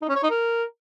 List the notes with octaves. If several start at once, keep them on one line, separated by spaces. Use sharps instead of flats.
D#4
C#4
C#5
D#4
A#4